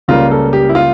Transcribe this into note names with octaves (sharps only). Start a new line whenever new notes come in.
C#2 C#3 G3 A#3 F4
A4
G4
E4
F4